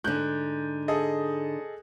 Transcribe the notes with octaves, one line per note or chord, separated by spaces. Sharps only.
G#2 D3 F#6 G6
G#4 A4 D#5